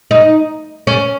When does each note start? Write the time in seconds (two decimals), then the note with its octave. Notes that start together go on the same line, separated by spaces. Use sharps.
0.11 D#4
0.87 C#4